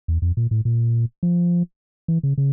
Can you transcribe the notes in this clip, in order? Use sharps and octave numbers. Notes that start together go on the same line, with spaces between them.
E2
F2
A#2
A2
A#2
F3
E3
C#3
C#3